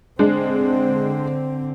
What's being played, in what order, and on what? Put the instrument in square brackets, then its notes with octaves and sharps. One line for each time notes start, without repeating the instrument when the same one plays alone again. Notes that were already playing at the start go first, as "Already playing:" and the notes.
[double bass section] D3 C4 [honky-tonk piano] G#3 D4